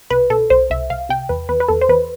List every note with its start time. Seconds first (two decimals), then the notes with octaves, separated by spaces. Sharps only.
0.10 C2 B4
0.30 B2 A4
0.50 C2 C5
0.70 C2 E5
0.90 C2 F5
1.09 C3 G5
1.29 E2 B4
1.49 E2 B4
1.60 B4
1.68 E2 A4
1.81 C5
1.89 E2 B4